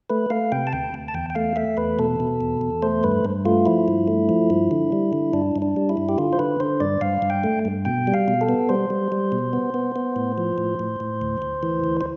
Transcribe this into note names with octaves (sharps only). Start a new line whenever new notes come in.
A3 B4
A3 F5
C3 G5
A5
D2 G5
D2
A5
E2 G5
G5
A3 F5
A3 E5
E2 B4
B2 A4
B2
E2
E2
A3 C5
G2 B4
G2
A3 F4
F3 E4
G2
A3
F3
G2
D3
G3
D3
G2 D4
G2
D4
G3
E4
G2
G4
D3 F4
C5
D3 B4
D3 C5
G2 D5
G2 F5
G2
G5
A3
G2
B2 G5
G3
F5
B2
A4
B3
G3 C5
G3
G3
B2
B3
B3
B3
A2
F3
A2
A2
A2
D2
D2
E3
D2
C5